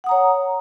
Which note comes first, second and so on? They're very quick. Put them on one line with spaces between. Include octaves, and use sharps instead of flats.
F#5 D#6 A#5 C#5